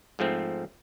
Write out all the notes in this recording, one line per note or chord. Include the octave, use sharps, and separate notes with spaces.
G#2 F3 A3 C4